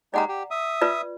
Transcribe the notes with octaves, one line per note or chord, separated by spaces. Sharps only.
G#3 D#4 G4 D5 F#5 A#5
G4
E5 D#6
F4 B4 D5